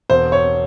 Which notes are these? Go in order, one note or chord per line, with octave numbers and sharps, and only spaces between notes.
E1 C5
C#5